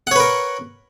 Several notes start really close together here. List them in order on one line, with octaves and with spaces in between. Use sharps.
F#5 C#5 B4 A#4